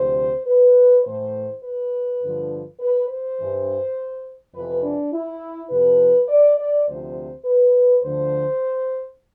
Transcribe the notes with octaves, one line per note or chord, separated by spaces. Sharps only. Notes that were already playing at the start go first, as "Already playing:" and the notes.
Already playing: D2 C3 F3 C5
B4
A2 E3 C5
B4
G2 D3 F3
B4
C5
G2 E3
F2 C3 E3 B4
D4
E4
F2 C3 F3 B4
D5
D5
D2 C3 F3 C5
B4
D2 D3 F3 C5